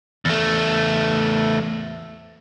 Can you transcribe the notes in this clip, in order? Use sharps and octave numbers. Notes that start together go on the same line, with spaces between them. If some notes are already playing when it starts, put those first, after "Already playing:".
E2 A3